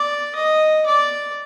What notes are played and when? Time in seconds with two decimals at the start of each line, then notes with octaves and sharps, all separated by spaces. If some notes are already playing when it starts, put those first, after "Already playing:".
Already playing: D5
0.35 D#5
0.87 D5